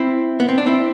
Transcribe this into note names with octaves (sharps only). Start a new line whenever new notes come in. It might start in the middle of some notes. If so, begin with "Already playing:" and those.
Already playing: C4 E4
B3
C4
D4
C4 E4